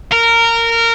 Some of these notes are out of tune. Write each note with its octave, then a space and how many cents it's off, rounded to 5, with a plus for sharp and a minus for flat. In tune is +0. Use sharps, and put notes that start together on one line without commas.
A#4 -15